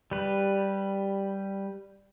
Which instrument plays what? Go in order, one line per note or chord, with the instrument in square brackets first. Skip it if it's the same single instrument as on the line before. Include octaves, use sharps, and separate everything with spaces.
[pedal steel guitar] G3 B4